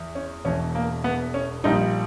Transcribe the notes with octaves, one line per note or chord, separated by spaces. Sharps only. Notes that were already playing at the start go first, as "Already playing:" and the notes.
Already playing: E2
C#4
E1 E2 B2 C#4
A#3
B3
C#4
A#1 A#2 G3 D#4